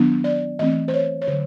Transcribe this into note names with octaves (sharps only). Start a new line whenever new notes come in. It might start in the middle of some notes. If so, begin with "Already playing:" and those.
Already playing: D#3 F#3 B3 D4
D5
E3 A3 C4 D#5
C5
C#5
C#5
D3 F#3 C5